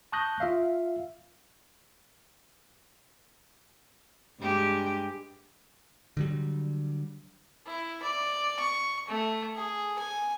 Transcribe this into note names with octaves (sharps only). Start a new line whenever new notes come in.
A5 C#6 D#6 F#6 G6 A#6
F4 E5 F5
G2 G#3 G4
D3 F#3 G3
E4
D5
C#6
A3
G#4
G#5